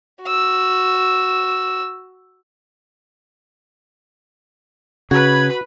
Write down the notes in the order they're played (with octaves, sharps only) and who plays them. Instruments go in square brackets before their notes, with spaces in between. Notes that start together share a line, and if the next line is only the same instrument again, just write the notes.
[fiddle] F#4 E6
[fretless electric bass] C#3 [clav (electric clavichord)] F#4 [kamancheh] B4 B5 [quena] G#6